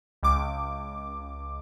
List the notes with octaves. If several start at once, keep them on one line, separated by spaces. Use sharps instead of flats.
C#2 D6